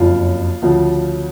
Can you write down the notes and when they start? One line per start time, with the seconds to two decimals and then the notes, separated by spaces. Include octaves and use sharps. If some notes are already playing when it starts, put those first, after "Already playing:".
Already playing: F#1 F2 C#3 F4
0.62 D2 C#3 F3